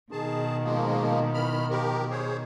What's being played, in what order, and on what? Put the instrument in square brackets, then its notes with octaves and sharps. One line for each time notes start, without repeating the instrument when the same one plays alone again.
[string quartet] B2 D#3 [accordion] G#4 A5
[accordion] F3 G#3 A#3
E3 B5 F6
F3 G4 A#4
G#4 C5 C#5